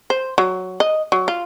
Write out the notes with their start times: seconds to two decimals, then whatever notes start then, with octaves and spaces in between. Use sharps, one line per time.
0.10 C5
0.38 F#3
0.80 D#5
1.12 F#3
1.28 F4